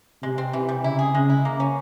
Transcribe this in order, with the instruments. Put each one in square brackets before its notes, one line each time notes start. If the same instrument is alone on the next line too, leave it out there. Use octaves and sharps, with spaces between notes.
[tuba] C3 [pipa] G#3
[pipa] C4
[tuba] C3 [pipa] E3
[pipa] G3
[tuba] C#3 [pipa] E4
[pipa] G#4
[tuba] C#3 [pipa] G#3
[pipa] E4
[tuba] C#3 [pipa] A#3
[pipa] C#4